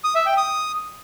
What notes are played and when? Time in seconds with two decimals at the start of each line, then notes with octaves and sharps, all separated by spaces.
0.04 D#6
0.15 E5
0.26 G5
0.37 D#6